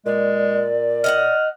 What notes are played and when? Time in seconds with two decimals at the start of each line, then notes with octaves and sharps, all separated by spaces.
0.06 A#2 G#3 D5
1.04 D#5 F5 F#5 F6